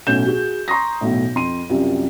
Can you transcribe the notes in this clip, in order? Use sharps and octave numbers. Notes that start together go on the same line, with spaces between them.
B1 A2 C#4 A4 G6 E7
F#4 G#4
A#5 C6 C#6 D#6 A#6
B1 E2 A2
F2 C6 D#7
C2 F#2 F4 G4